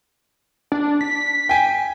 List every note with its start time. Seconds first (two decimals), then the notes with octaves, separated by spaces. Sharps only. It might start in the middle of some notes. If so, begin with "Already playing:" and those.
0.72 D4
1.01 B6
1.49 G5 G#5